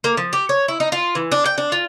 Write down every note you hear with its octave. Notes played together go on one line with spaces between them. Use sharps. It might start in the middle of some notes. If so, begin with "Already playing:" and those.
A#3
F3
G4
C#5
E4
D#4
F4
E3
D4
G5
D4
F4